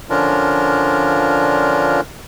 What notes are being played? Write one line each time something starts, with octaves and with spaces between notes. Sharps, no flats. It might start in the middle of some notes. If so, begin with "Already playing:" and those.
D3 F3 C#4 D4 F4 A#4